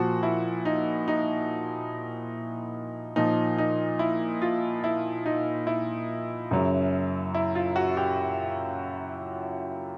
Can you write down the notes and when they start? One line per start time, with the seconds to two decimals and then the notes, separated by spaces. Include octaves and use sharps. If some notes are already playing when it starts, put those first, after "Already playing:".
Already playing: A#2 F3 F#4
0.23 E4
0.65 D#4
1.08 D#4
3.16 A#2 F3 D#4
3.58 D#4
3.99 E4
4.42 F4
4.84 E4
5.26 D#4
5.67 E4
6.51 F#2 C#3 F#3
7.34 E4
7.55 F4
7.76 F#4
7.97 G4